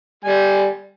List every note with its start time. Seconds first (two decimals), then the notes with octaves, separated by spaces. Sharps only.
0.24 G3 G#5